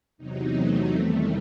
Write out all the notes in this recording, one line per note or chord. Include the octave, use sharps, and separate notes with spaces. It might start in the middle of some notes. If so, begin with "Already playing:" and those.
E2 C3 F#3 D#4
A3
E2 C3 D#3 G3